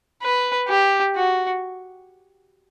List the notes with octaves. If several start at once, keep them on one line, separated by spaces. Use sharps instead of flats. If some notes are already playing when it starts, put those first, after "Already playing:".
B4
G4
F#4